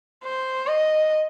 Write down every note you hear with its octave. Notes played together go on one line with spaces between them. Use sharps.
C5
D#5